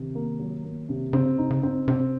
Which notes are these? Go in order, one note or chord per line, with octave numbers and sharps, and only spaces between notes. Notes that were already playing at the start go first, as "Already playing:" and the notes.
Already playing: C3 D#3
A#3
F#3
A#3
C3
C#3 C4
D#4
C#3
C4
C3 C4